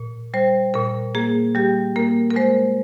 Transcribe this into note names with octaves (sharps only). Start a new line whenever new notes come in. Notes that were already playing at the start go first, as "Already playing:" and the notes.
Already playing: A#2
G3 C5
A#2 A#4
A#3 G#4
G3 G4
A#3 A#4
A#4
G#3 C5